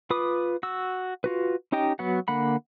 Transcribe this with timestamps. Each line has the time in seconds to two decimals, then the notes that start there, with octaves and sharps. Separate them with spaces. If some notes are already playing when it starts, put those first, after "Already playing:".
0.10 F4 B4 B5 D6 D#6
0.63 F#4 E6
1.24 F4 F#4 B4
1.72 C#4 D#4 G4 D#5 G5
1.99 F#3 B3 F#4 F#5
2.28 D3 A#3 F#5 B5